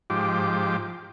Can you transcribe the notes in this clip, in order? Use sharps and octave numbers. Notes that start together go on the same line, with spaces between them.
G#2 F3 G4 D6